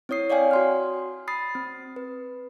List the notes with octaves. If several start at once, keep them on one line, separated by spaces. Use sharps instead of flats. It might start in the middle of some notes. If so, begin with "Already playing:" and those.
C4 E4 C#5 D#6 C7
C#5 D5 F5 G5 G#5
F#4 C6 F6
B5 D#6 A6 C7
C4
B4